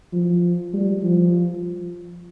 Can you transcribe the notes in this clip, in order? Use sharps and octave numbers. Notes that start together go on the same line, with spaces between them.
F3
G3
F3